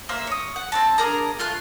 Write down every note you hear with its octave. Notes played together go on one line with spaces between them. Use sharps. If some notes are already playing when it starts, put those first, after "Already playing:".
A#3 C5 E5
C#5 D#6
F#5
C4 C#4 A5
D4 G#4 A#4 A#5
A3 F4 C6 F#6